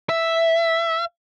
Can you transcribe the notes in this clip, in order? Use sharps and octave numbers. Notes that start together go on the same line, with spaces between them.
E5